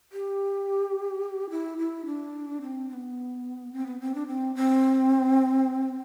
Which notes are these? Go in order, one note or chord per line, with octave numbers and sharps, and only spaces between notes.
G4
E4
E4
D4
C4
C4
B3
C4
B3
C4
D4
C4
C4